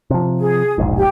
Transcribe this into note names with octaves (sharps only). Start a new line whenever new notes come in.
C3 F3
G#4
E1 A#1 G#2
G4